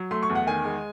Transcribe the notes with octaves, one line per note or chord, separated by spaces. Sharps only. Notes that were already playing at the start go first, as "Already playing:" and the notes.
Already playing: F#3
A3 C6
C#6
E2
F#5
D#3 G#5
G#3